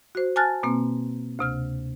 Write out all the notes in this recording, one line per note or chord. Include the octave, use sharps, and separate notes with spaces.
F#4 C5
G#5 A5 F6 F#6 A6
B2 A#3 C4
D2 C3 F6